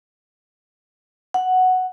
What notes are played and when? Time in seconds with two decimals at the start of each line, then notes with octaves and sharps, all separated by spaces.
1.34 F#5